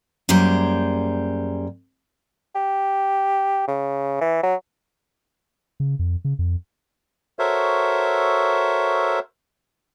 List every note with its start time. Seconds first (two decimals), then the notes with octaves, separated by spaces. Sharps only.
0.29 F#2 G3 A#3 G#4 C5
2.55 G4
3.68 C#3
4.21 E3
4.43 F#3
5.80 C#3
5.99 F2
6.24 C#3
6.39 F2
7.39 F#4 A4 A#4 C5 C#5 E5